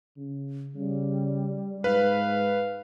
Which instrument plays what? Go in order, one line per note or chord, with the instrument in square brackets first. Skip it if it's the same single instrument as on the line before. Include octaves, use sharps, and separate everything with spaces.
[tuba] C#3
[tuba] C#3 [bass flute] G3
[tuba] G#2 [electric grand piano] B4 [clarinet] F5